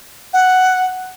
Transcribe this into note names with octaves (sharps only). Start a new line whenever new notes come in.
F#5